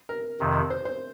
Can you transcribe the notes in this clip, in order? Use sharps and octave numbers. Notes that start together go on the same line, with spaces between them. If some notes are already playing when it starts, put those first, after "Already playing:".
A#4
F2 C3 D#3
C5
C5